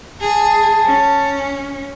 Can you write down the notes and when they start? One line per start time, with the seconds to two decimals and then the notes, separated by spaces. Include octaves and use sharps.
0.21 G#4 A5
0.86 C#4